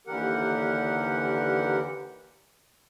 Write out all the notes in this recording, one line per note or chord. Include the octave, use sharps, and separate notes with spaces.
D#2 D3 E3 G4 A#4 F#5